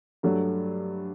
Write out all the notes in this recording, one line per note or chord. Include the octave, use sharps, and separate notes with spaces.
G2 F#3 A3